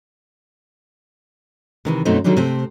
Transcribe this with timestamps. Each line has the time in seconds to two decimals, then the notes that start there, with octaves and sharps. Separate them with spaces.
1.85 C3 D#3 E3
2.05 F#2 B2 F#3 A3 C4 D#4
2.24 D3 D#3 F#3 G3 D4 D#4
2.37 C3 A3 C4